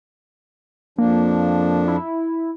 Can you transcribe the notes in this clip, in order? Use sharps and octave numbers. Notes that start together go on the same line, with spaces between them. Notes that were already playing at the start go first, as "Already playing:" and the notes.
F2 F3 A#3 D4
E4